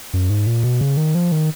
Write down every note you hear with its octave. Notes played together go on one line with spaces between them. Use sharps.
F#2
G#2
A#2
B2
C#3
D#3
F3
D#3